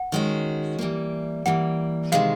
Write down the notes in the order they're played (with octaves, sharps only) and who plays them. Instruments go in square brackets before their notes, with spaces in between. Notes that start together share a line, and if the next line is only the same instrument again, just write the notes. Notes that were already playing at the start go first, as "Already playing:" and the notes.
Already playing: [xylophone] F#5
[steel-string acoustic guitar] D#3 G#3 C#4 F#4
E3 G3 A#3
[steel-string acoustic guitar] E3 G3 A#3 [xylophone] F#5
[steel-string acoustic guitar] C3 D#3 G#3 [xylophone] F5